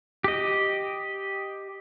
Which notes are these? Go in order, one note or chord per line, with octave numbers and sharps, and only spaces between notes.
G4 D#5